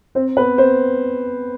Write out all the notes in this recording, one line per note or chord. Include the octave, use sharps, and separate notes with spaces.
C4 C5
B3 B4
C4 C5